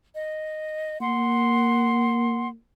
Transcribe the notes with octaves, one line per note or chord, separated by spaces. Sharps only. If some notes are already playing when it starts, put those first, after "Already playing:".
D#5
A#3 F#5 C6